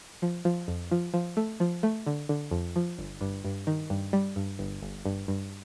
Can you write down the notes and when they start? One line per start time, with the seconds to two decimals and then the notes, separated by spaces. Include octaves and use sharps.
0.22 F3
0.45 F3
0.68 F2
0.91 F3
1.14 F3
1.37 A3
1.60 F3
1.83 A3
2.07 D3
2.29 D3
2.51 F2
2.76 F3
2.99 G1
3.21 G2
3.45 G2
3.67 D#3
3.90 G2
4.13 G3
4.36 G2
4.59 G1
4.82 G1
5.05 G2
5.28 G2